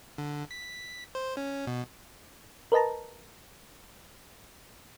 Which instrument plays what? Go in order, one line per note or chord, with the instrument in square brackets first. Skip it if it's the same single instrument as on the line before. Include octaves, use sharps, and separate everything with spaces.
[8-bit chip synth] D3
B6
C5
C#4
B2
[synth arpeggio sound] A#4 B4 D#5 A5 A#5